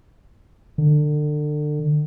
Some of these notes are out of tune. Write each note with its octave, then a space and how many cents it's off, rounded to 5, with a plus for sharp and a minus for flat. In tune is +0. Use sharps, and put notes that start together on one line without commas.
D3 +30